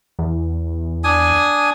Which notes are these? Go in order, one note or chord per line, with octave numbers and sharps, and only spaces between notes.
E2
D4 G#5 D#6